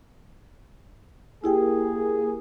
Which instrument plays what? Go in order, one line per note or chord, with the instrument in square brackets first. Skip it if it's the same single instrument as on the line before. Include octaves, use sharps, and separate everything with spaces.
[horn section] A#3 G#4 [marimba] E4 G4 G5